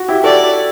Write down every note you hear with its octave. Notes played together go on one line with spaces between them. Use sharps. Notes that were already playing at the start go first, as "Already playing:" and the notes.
Already playing: F#4
E4 G4
F#4 A4 D5